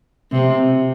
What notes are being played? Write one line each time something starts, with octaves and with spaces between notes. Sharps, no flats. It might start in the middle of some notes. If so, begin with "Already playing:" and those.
C3